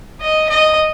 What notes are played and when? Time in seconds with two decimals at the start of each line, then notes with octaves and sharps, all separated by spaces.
0.21 D#5
0.49 D#5